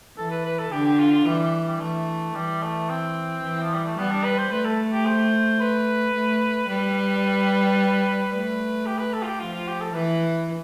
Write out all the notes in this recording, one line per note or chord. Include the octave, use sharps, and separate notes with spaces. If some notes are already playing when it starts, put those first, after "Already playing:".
E3 A4
B4
B4
A4
D3 G4
G4
F4
F4
E3 G3
G3
G3
E3 A3
E3 G3
A3
C4
E3
F3
G3
A3
G3 B3
D4
B4
C5
A3 B4
A4
G4
C5
B4
A3
G3 B4
A3 B4
G4
B4
A4
F4
G4
F3 F4
F4
G4
A4
E3 B4